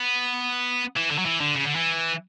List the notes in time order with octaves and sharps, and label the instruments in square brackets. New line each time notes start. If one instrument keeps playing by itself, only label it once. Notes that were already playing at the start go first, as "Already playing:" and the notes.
Already playing: [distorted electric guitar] B3
E3
D3
F#3
E3
D3
C#3
D3
E3